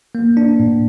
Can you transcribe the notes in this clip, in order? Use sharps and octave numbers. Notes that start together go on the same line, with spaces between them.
A#3
D4
A2